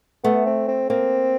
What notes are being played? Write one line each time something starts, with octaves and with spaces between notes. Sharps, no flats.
A3 B3
C4
C4
A#3 C4